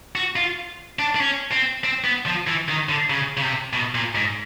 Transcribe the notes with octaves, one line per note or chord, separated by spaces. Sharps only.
F#4
F4
D4
D4
C#4
C4
C4
B3
F3
E3
D#3
D3
C#3
C#3
C3
B2
A#2
G#2